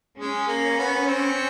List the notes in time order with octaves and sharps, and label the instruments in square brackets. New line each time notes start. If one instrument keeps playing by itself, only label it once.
[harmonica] G#3 [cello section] C#4
[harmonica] A#3
B3
C4